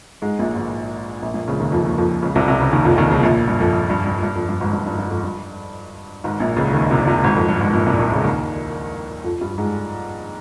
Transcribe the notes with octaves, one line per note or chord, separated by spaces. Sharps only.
G#2 G#3
A#1 A#2
G#1 G#2
A#1 A#2
A#1 A#2
C#2 C#3
D#2 D#3
F2 F3
D#2 D#3
F2 F3
C#2 C#3
C2 C3
C2 C3
C#2 C#3
D#2 D#3
F2 F3
D#2 D#3
C#2 C#3
A#1 A#2
G2
F2
F2
G2
G2
G2
F2
G2
G#1 G#2
G2
G2
G2
F2
G2
G#1 G#2
A#1 A#2
C#2 C#3
D#2 D#3
C2 C3
C2 C3
G#1 G#2
F2
G2
G#1 G#2
A#1 A#2
C2 C3
C2 C3
C#2 C#3
D#2 D#3
F2 F3
G2 G3
G#2 G#3